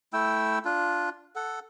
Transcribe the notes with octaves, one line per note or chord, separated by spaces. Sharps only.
A3 E4 G5 E6
D4 F4
A4 F#5